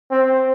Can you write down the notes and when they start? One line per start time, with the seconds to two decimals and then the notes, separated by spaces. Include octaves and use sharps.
0.11 C4